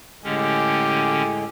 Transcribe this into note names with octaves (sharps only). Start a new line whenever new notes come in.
A2 D3 G#3 C#4 G4 G#4